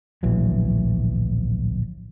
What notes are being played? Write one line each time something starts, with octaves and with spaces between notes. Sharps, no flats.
D1 A#1 E3 F#3